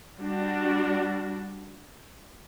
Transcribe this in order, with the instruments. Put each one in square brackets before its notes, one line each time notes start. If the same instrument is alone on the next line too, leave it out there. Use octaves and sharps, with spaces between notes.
[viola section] G3 D4 F#4